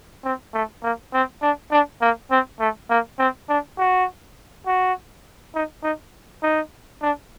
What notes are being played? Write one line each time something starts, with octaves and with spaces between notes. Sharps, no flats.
C4
A3
A#3
C4
D4
D4
A#3
C4
A3
A#3
C4
D4
F#4
F#4
D#4
D#4
D#4
D4